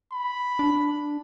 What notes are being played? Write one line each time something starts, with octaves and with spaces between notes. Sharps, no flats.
B5
D4